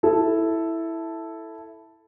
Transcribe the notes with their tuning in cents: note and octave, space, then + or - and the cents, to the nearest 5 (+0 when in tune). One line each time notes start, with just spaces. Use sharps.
E4 +0 A4 +0